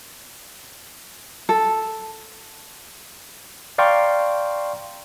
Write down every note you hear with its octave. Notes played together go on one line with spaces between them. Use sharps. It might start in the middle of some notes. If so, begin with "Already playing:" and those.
A4
D5 F5 G5 A#5 C6 C#6